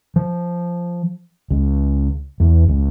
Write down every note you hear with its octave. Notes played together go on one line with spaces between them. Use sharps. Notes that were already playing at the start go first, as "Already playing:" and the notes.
F3
C#2
E2
C#2